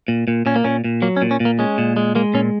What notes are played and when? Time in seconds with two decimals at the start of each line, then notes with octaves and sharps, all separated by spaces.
0.08 A#2
0.28 A#2
0.46 A#2 C#4
0.56 A#3
0.64 A#2 C#4
0.84 A#2
1.02 F#3 A#3
1.16 C#4
1.22 A#2
1.31 C#4
1.40 A#2
1.45 A#3
1.59 G#3 C#4
1.78 A#2
1.96 G#3
2.15 G#3 A#3
2.34 A#2 C#4